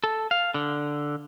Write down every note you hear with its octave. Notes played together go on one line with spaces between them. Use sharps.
A4
F5
D3